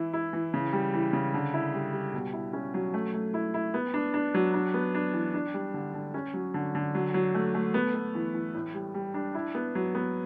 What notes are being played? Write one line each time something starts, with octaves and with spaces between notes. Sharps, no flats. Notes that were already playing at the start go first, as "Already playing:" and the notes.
Already playing: E3 E4
E4
E3
C#3
G3
E3
C#3
D3
E4
G3
G3
B2
E4
C#4
F#3
A3
A3
E4
E4
B3
D4
D4
F#3
D4
B3
D4
E3
D4
G3
D3
D3
C#4
F#3
D3
D3
F#3
F#3
A3
A3
B3
B3
E3
E3
A2
G3
G3
D4
E4
B3
F#3
B3